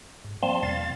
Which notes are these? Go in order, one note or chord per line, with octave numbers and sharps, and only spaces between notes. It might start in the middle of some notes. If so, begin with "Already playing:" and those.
G#2
F3 G3 A#3 C4 A5 C6
E2 B2 F5 A6